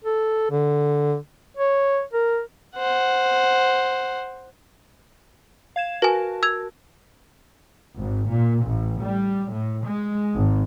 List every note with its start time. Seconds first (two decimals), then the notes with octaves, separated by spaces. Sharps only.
0.05 A4
0.51 D3
1.57 C#5
2.14 A#4
2.77 C5 F#5
5.76 F5 G#6 E7
6.02 F#4 A#4 B4 G#5 A5
6.43 E6 G#6 F7
7.98 G#1
8.30 A#2
8.65 A1
9.03 G3
9.51 A2
9.88 G#3
10.35 G#1